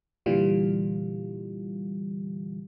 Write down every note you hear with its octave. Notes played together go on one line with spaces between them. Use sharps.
A#2 D3 E3 G3 F4